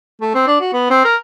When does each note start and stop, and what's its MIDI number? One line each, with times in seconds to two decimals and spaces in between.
0.21 0.31 57
0.35 0.47 60
0.47 0.56 62
0.60 0.72 66
0.73 0.87 59
0.90 1.05 60
1.05 1.16 70